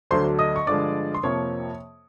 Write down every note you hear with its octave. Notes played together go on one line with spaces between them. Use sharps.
D2 D3 F#3 A3 D4 C5 C6
D#5 D#6
C#6
G2 D3 F3 G#3 D5 D6
C6
F2 C3 F3 A#3 C#5 C#6